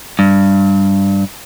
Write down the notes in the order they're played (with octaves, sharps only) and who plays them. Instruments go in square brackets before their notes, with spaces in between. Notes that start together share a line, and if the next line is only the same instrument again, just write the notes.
[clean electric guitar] G2